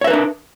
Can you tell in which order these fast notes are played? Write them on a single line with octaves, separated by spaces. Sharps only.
C#5 E5 B4 A#4 D4